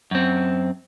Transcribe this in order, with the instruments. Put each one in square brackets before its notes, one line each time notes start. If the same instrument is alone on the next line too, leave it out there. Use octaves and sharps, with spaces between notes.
[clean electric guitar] F#2 C4